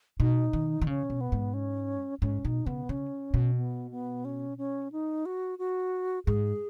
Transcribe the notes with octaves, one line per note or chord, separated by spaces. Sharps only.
B2 D#4
D#3
D#3
C#3 C#4
B2
B3
G#2
C#4
G#2 C#4
B2 D#4
C#3 B3
C#3 C#4
B2
B3
B3
C#4
C#4
D#4
F#4
F#4
G#2 G#4